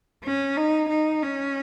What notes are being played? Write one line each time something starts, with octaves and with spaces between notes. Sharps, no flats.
C#4
D#4
D#4
C#4